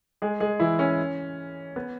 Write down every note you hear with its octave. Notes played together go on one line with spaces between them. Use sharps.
G#3 G#4
G#3 G#4
E3 E4
C#4
B3